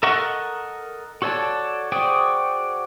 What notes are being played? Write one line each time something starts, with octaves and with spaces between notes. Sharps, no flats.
A4 A#4 D#5 F#5 C#6
F#4 A4 C#5 D5 A5
F#4 G#4 C5 D5 G5